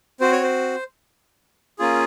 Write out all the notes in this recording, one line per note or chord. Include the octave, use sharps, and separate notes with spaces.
C4 F#4 C5
C#5
C5
A#3 C#4 F4 G#4